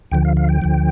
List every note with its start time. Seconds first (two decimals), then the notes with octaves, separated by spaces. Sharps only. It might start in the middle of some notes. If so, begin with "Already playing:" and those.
0.11 D2 D3 F3 G5
0.25 F5
0.37 F5
0.49 G5
0.62 D2 D3 F3